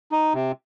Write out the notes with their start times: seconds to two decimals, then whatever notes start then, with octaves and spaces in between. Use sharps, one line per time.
0.12 D#4
0.34 C3